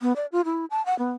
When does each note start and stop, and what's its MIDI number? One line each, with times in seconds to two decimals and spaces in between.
0.01 0.15 59
0.16 0.26 74
0.32 0.42 65
0.45 0.65 64
0.71 0.84 81
0.86 0.97 78
0.99 1.11 59